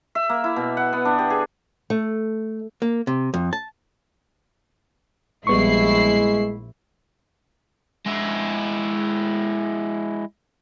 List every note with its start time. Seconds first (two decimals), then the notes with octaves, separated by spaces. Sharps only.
0.15 E5
0.29 A#3
0.44 E4
0.56 B2
0.77 F#5
0.93 B3
1.05 D4
1.19 G4
1.30 G#4
1.90 A3
2.82 A#3
3.07 C3
3.34 F2
3.53 A5
5.47 A#1 G3 G#3 B3 E4 C#6 C7
8.06 G#3 E4